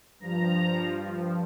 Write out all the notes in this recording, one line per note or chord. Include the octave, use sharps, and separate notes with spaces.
G2 F3 A#5